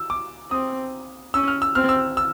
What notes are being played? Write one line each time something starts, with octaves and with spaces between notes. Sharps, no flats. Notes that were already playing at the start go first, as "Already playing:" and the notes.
Already playing: E6
D6
C4 D#6
C#4 E6
F6
E6
C4 F6
E6
E6